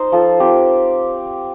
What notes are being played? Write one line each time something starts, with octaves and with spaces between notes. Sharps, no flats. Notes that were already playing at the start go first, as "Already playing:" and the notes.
Already playing: D#4 C5
F3 A4
C4 G4